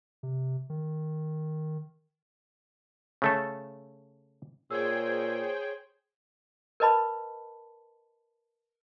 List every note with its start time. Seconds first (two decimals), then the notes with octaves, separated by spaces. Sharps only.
0.23 C3
0.70 D#3
3.22 C#3 A3 A4
4.71 A#2 G#4 C5 C#5 G5 E6 G#6
6.80 A#4 B4 D#5 A5 B5